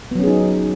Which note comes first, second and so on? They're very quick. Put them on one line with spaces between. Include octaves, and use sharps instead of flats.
B3 F#3 C#4 G#4 D#4